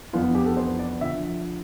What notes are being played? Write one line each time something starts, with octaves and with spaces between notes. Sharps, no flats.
F2 E3 B3 D4 F4
G4
A4
C5
D5
D3 F3 E5